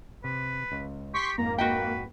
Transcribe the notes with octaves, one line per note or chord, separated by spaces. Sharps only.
C3 B4
C#2
G4 C6 C#6 B6
F2 G#2 A#3 A#5
F#4 B4 D#5 G5